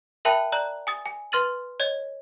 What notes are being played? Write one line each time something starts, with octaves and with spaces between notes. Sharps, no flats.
A#4 E5 G5 A5 B5 F#6
D5 A#5 F#6 F#7
G#5 D#6 A6
G#5
B4 C6 F6 A6 D#7 F#7
C#5 D#5 G#6